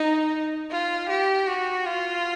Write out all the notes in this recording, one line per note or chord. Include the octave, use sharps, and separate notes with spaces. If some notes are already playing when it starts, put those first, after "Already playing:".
Already playing: D#4
F4
G4
F#4
F4